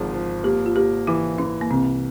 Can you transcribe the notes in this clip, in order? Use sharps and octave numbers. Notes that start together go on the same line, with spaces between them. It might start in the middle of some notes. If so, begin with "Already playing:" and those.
Already playing: G#1 G#2 F3 G#4
F3
A#3 G4
F4
A#3 G4
E3 E4
E3 C#4
A#3
C2 C4